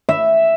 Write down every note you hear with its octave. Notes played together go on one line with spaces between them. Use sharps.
E5